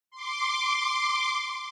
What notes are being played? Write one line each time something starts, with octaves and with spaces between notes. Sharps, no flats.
C6 D6